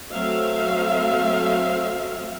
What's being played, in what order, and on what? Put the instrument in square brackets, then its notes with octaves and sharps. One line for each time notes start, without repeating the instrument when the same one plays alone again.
[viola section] F#3 A3 C4 E5 F5